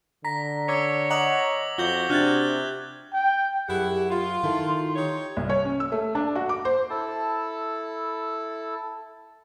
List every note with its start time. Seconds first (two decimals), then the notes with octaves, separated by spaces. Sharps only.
0.24 D3 A#5 A#6 B6
0.69 C#5 D6 E6 G#6
1.10 D#5 F#5 A#5 D6 F#7
1.78 F2 F4 F#4 D6 G6 G7
2.10 C3 D4 F6 F#6 G#6 A6
3.14 G5
3.69 F#2 E4 G4 G#4 F#5
4.10 F4 C6
4.43 D#3 E4 A4
4.96 D#4 G4 C#5
5.37 C2
5.50 C#5
5.65 C#4
5.80 E6
5.92 A3
6.15 D4
6.35 F#4
6.49 D6
6.65 C5
6.90 E4 A4 A5